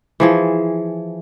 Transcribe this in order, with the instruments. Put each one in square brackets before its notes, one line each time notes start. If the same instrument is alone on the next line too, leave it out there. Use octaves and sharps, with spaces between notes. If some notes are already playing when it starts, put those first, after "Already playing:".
[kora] E3 F3 G#4